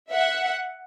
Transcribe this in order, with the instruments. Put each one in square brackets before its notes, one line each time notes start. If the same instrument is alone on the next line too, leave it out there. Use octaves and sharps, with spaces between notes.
[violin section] E5 F#5